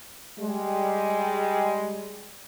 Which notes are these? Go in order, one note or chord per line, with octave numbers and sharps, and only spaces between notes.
G3 G#3